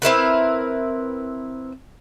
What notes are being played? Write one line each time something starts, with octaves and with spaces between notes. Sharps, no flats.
C4 E4 A#4 B4